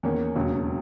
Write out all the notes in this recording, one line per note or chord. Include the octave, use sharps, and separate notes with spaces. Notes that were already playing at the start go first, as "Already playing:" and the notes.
E2 D#3 A#3 C#4
E1 D#2 C#3 F#3 C#4